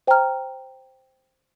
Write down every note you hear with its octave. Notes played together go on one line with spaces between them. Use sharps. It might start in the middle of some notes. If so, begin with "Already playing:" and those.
C5 G5 A#5 F6